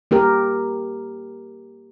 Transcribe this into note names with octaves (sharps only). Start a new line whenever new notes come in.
A#3 G4 A#4